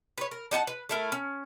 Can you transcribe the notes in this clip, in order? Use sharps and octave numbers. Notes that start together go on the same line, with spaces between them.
B4 C#5
A#4
D4 D#4 F#5 A5
B4
A3 E4 A#4
C#4